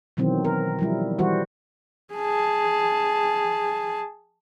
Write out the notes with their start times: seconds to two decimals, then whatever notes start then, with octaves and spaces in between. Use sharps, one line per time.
0.17 B2 D#3 E3 F#3 C4
0.45 A#4
0.79 F3 G3 E4
1.19 E3 G3 F#4 C5
2.15 G#4 A5